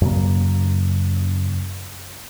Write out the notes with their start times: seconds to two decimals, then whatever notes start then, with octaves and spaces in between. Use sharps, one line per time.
0.01 F#2 C#3 A#3